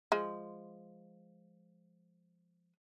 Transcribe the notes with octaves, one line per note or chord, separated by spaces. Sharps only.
F3 G#3